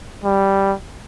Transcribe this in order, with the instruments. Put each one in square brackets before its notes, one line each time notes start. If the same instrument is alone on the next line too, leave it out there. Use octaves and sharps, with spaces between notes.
[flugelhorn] G3